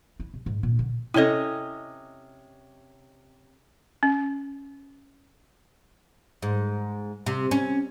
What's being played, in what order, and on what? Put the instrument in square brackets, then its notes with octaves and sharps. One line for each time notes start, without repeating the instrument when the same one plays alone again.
[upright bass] E4
C3
G#2
A#2
D3
[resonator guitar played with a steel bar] C3 C#4 D#5 [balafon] E4 A4
[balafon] C#4
[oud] G#2
C3
C#4